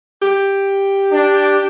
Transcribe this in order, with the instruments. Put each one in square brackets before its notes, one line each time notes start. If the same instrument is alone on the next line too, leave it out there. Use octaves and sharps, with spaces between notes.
[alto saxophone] G4
[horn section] D4